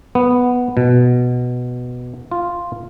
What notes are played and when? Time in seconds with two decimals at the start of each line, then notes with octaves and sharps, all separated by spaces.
0.15 B3
0.77 B2
2.31 F4